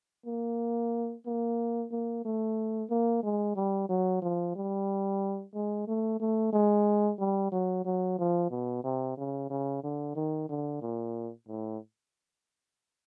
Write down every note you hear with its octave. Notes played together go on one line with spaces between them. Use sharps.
A#3
A#3
A#3
A3
A#3
G#3
G3
F#3
F3
G3
G#3
A3
A3
G#3
G3
F#3
F#3
F3
B2
C3
C#3
C#3
D3
D#3
D3
A#2
A2